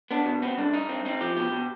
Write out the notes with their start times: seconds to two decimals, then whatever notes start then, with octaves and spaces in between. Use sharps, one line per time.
0.11 B3 D4
0.26 B2
0.42 B3 C4
0.58 C2 D4
0.73 G2 D#4
0.89 C4
1.05 C4 D#4
1.21 F3 G4
1.37 B2 G4
1.52 B2